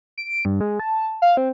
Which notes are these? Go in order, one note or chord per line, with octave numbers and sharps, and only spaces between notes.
D7
G2
G#3
A5
F5
C4